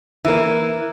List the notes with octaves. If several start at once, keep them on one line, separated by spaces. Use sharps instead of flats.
E3 A#3 E4